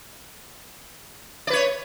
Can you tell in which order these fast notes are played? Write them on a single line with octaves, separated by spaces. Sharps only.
D5 B4 C#5